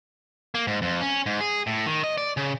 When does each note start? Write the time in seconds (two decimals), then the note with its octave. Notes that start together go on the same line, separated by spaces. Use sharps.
0.55 A#3
0.67 G#2
0.82 F2
1.01 C#4
1.26 G#2
1.41 G#4
1.67 A2
1.86 D#3
2.04 D#5
2.18 D5
2.37 C#3